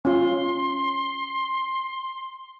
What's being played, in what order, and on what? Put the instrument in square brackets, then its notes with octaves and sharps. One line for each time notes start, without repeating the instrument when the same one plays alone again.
[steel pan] C#4 F4 [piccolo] C6